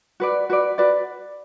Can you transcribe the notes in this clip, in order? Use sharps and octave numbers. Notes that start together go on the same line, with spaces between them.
F#4 B4 D5
F#4 B4 D5
F#4 B4 D5